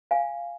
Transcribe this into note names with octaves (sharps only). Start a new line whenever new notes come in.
F5 G#5